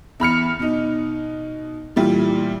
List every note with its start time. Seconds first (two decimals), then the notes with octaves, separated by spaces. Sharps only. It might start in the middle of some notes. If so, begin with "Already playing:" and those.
0.20 E2 B5 F6 C#7
0.59 B2 D#4
1.96 A#2 E3 G3 F4